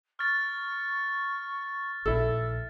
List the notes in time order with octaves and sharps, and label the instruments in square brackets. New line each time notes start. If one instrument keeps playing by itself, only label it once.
[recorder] C#6 [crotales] F6 A6
[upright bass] A#1 [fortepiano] E4 A4